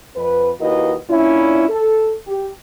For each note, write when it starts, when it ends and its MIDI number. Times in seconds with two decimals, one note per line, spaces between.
0.15 0.50 41
0.15 0.50 71
0.59 0.93 39
0.59 0.93 64
0.59 0.93 66
0.59 0.93 70
0.59 0.93 71
0.59 0.93 75
1.08 1.66 46
1.08 1.66 61
1.08 1.66 62
1.08 1.66 64
1.68 2.12 69
2.26 2.48 67